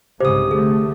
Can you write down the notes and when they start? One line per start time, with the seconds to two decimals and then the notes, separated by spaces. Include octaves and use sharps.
0.20 C2 G#2 C#3 G4 C5 D#6
0.51 D3 A3 G#4